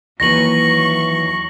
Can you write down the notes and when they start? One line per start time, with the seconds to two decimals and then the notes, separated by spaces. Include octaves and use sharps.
0.20 D#2 E3 F#3 B4 C#6 A#6 F#7